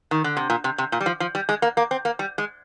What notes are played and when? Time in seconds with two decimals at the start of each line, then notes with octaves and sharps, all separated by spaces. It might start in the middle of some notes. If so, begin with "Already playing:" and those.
0.11 D#3
0.24 D3
0.37 C3
0.50 A#2
0.64 C3
0.78 C3
0.92 A#2
1.01 G3
1.06 F3
1.20 F3
1.35 G3
1.49 G#3
1.62 A#3
1.77 A#3
1.91 C4
2.05 A#3
2.19 G3
2.38 G#3